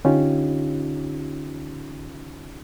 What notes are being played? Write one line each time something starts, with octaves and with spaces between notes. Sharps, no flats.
D3 C#4 D#4 F4 G4